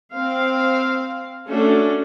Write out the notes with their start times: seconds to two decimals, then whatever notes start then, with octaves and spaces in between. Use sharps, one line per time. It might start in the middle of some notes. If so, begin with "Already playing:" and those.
0.13 C4 F5
1.49 A3 C#4 D4 F#4 A4